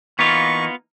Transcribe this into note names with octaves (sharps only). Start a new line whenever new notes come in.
E3 A#3 B3 D#4 F4 C#6